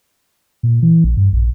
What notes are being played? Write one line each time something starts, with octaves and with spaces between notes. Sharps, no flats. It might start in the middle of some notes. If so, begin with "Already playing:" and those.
A#2
E3
A#1
G2
A#1